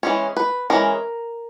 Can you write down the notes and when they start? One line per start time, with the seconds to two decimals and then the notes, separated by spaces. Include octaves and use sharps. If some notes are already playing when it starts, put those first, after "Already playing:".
0.03 E3 G#3 C#4
0.37 B4
0.70 E3 G#3 C#4 A#4